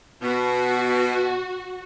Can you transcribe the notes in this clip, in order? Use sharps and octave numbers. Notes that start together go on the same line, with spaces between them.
B2 F#4